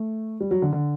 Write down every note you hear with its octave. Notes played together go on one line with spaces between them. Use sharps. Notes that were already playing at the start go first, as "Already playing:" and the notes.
Already playing: A3
G3
F#3
D3
D3